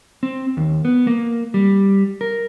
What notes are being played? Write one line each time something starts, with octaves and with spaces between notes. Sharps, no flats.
C4
D#2
B3
A#3
G3
A#4